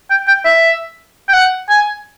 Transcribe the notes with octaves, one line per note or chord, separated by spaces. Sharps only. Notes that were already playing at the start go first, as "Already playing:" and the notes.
G5
G5
E5
G5
F#5
G#5